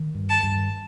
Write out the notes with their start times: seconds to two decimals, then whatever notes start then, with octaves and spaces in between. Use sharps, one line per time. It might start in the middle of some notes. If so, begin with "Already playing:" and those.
Already playing: D#3
0.15 G2
0.29 A5
0.43 G2